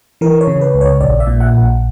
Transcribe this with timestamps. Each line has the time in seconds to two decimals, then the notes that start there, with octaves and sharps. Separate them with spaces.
0.21 E3 A#4
0.41 C#5
0.47 C#3
0.61 B4
0.75 C#2
0.81 C#5
1.01 A#1 D5
1.20 E5
1.27 A#2
1.40 F#5
1.54 A#1